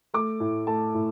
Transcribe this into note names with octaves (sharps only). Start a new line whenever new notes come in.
A3 D6
A2
A3 A5
A2